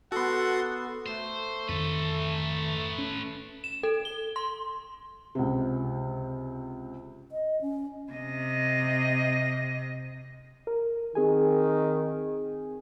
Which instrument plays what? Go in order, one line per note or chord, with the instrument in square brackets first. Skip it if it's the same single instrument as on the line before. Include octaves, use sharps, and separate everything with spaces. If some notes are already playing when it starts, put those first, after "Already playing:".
[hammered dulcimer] B3 A4 [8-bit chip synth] F#4 C6 [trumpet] F#5
[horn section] A3 [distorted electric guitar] C5
[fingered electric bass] F2 D#3 [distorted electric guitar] A4 B4
[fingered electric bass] C#4
[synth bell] E7
A4
G7
C6
[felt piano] C#2 C3
[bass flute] D#5
C#4
[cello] C3 D#5
[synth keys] A#4
[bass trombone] D#3 [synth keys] C4 G#4 G#5